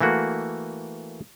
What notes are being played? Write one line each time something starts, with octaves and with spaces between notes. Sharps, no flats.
E3 A3 A#3 F#4